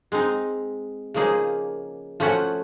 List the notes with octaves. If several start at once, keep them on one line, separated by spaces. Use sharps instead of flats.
G#3 C4 D#4
C#3 F3 A#3 D#4 G#4
F3 A3 C#4 F#4